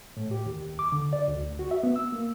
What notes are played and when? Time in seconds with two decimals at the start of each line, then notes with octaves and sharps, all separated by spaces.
0.17 A2
0.31 G4
0.46 D#2
0.79 D6
0.92 D3
1.13 D5
1.28 D2
1.59 F#4
1.71 E5
1.83 B3
1.96 E6
2.12 A#3